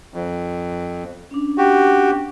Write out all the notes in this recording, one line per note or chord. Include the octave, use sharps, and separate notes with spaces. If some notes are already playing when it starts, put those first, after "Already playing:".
F2
C#4 D4
F#4 G4